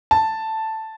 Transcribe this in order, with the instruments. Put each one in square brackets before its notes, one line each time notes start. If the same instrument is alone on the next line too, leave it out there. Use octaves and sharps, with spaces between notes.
[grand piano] A5